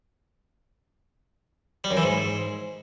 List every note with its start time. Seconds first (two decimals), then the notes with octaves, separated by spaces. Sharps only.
1.84 G3
1.91 F#2
1.97 E3
2.03 G#2